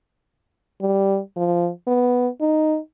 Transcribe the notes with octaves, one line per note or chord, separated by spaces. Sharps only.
G3
F3
B3
D#4